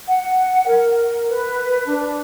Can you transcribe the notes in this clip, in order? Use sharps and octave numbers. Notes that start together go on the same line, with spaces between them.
F#5
A#4
B4
D4